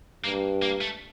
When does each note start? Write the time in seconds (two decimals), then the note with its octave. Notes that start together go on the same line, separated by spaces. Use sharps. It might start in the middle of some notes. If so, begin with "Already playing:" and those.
0.24 G2 A#3
0.62 A#3
0.81 A3